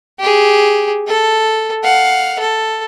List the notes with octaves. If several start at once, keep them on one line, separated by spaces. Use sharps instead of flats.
G4 G#4
A4
F5 F#5
A4